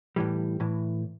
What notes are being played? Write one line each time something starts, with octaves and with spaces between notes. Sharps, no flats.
A2 E3 G3
A2 E3